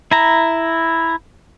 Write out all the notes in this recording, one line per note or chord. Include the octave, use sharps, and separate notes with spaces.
E4 A#5